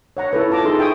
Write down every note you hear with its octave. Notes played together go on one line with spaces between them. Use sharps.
C#5 F#5 A#5
E4 A4 B4 C#5
E4 F4 A5 A#5 D6
D#4 G#4 A4 C6 D6
E5 G5 G#5 C#6 D#6